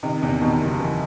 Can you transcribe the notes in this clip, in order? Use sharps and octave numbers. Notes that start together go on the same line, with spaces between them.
C3 D#3
E2 C3
B2 D#3
F#1
E3